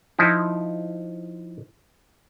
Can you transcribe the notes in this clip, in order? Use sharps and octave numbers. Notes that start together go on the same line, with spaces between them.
F3 D#4 E4